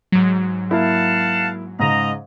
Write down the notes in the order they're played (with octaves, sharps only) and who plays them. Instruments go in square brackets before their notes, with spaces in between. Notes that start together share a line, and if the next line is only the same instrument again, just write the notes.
[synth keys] G#2 F#3
[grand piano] A#3 E4 [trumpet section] F5 F#5 A5
[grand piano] G#2 C#3 [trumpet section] D#5 A#5